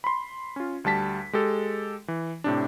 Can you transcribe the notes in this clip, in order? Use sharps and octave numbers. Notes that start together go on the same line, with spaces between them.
B5 C6
C#4 F4
D2 G3 A5 B6
G#3 G4 A4
E3
A2 C3 D4